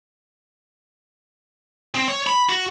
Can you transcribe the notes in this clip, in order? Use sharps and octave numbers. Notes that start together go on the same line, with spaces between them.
C4
C#5
B5
F#4